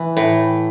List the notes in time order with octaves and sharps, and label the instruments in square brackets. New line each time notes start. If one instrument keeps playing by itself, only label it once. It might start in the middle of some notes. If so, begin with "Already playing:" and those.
Already playing: [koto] E3
A2